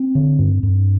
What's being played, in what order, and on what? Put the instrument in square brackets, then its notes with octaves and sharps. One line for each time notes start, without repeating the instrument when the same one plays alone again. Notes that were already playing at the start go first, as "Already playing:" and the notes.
Already playing: [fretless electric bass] C4
D3
G2
G2